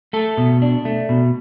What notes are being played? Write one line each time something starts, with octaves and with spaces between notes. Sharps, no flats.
A3 A4
B2
D4
A3
B2